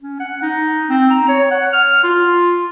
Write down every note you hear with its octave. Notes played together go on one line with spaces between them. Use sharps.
C#4
F#5
D#4
C4
A#5
C#5
F#5
F6
F4